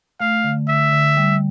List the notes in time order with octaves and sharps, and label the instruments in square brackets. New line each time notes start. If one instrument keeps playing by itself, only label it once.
[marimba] A3 [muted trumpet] F5
[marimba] D3
[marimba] D3 [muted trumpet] E5
[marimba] D3
G3